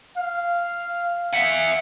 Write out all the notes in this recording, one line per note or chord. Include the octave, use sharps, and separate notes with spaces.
F5
E5 F#5